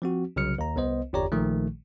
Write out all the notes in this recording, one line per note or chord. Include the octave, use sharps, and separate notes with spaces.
F3 C4 F#4
C2 C#3 F#3 F6 C#7
D#2 A#5
C2 B3 C5 D#5
G1 E2 G4 C#5 D5 A#5
A#1 A#2 D#3 F3 A3